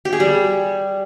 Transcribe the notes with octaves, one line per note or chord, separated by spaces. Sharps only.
G4
G#4
G3